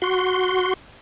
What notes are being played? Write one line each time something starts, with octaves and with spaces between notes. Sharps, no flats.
F#4 C6